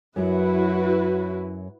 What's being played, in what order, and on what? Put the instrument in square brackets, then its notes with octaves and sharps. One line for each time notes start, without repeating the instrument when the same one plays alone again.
[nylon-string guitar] F#2 F#3 [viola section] E4 F#4 B4